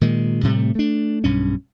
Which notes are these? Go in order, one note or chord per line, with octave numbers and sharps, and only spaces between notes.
A#2 D#3 G#3
A2 C3 G3 A3
A3 D4
B1 G2 C#4